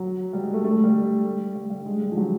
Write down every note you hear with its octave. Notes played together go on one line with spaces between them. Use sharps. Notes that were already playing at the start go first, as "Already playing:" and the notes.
Already playing: F#3
G3
G#3
A3
A3
G3
G3
G3
G#3
G3
F3
F#3